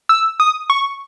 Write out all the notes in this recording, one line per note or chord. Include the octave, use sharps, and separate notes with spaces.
E6
D#6
C#6